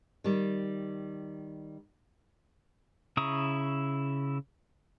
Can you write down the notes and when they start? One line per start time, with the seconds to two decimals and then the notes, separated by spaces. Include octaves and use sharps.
0.24 D#3 G3
3.17 C#3 E4 A#5 C#6 D#6